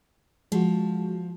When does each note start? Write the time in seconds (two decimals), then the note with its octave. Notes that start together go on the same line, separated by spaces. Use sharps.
0.52 F3 G#3 F#4